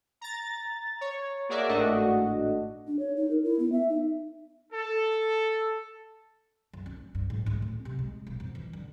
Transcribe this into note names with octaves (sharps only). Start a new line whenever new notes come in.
A#5 A6
C#5
A#3 F#4 G#4 A#4 D5 E5
G#1 A2 A3 D4 F#4 D#5
D4
C#5
D#4
A#4
E4
B3
E5
D#4
A4
F#1
C#4
G2
G#2
D2
A2
C3
G#3
E1
F2
E3
D3